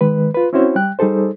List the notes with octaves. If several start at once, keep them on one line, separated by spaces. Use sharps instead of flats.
D#3 G#3 B4
F4 B4
C4 C#4 E4 F#4 C5 C#5
G3 G5 F#6
G3 D#4 G#4 A4 C5